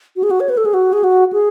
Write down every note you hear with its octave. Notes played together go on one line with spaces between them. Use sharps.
F#4
G#4
F#4
C#5
B4
A4
G#4
F#4
G#4
F#4
G#4